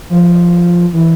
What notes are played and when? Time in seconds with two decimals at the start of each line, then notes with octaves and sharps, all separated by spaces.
0.10 F3
0.93 E3